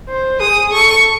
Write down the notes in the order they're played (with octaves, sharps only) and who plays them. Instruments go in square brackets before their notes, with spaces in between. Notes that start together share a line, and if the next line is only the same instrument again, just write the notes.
[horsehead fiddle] C5
[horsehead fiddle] G#4 [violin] D#6
[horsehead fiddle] A4 [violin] C#6